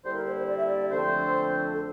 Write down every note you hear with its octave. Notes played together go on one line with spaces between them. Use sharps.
D3 G3 A#3 E4 C5
A#4
C5
C5
D5
E5
D5
F2 D3 F3 A3 C4 C5
A4